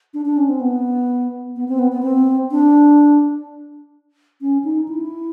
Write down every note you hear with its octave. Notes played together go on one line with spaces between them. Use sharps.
D4
D4
C#4
C4
B3
B3
C4
B3
B3
C4
D4
C#4
D#4
E4